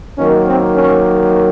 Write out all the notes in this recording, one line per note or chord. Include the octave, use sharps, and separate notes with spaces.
D#3 F#3 A#3 C#4
C4
C#4